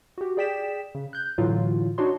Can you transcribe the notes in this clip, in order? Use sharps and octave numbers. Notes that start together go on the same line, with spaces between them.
F#4 G4
G#4 D5 G5 B6 E7
C#3
F#6 G6
A2 D3 E3 F#3 F4
D4 D#4 F#4 C#5 C6